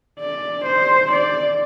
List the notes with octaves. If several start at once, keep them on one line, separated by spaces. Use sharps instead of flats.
D5
C5
D5